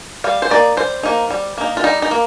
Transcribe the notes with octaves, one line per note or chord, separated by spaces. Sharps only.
G3 F5
C5
A#3 D#4 D5
G3 C5
A#3 D#4
G3
A#3 D#4
F4
G3 D#4
D#4
A#3